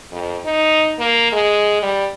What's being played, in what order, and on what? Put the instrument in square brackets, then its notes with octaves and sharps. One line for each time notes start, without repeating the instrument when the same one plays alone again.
[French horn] F2
D#4
A#3
G#3
G3